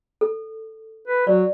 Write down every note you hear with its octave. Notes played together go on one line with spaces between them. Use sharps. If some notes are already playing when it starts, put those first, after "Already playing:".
A4
B4
F#3 D5